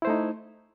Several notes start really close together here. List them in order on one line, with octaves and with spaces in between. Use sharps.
E4 C5 A3 D#4